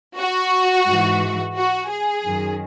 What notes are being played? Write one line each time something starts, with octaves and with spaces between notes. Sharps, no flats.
F#4
G#2 E3
F#4
G#4
F#2 D#3